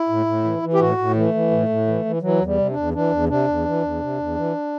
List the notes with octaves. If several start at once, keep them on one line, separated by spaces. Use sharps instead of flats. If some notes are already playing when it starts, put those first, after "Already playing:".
Already playing: E4
A2
A2
E3
E3
G4
A2 F#4
A2
E3 A3
E3
A2
A2
E3
E3
E3 F#3
E2
G3
C3
D4
E2
E3 D4
E2
C3 D4
E2
E3
E2
C3
E2
E3